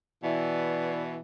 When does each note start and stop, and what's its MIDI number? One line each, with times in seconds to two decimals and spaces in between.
0.23 1.18 47
0.23 1.18 52
0.23 1.03 74